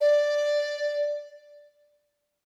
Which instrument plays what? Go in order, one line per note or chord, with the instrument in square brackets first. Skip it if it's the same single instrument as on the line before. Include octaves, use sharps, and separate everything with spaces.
[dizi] D5